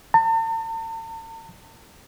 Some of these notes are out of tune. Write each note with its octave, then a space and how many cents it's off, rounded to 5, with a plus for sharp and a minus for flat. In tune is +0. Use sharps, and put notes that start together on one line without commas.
A5 +45